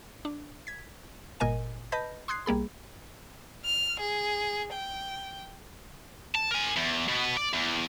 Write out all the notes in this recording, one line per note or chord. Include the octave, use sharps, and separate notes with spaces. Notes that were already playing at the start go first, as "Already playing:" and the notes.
D4
G#6 B6
G1 A#2 A#4 D#5 G#5 D#7
B4 D#5 A5 B5 G6 A#6
C6 D#6 F#6 G#6 C7
B1 G3 A#3 G#4 B5
F6
G#4
G5
A5
A#4 G#5
E2
B2 B3
D5
E2